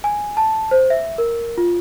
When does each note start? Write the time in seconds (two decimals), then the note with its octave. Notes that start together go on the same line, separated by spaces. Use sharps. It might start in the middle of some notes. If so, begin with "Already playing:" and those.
0.04 G#5
0.37 A5
0.71 C5
0.90 E5
1.18 A#4
1.58 F4